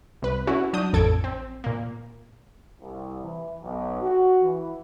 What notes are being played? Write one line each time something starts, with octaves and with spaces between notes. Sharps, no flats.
C2 B4
C#4 E4 F#4
F#3 D4 D#6 G6
A1 F2 A4 G#6 D7
C4
A#2 A#3
C2
E3
B1
F#4
E3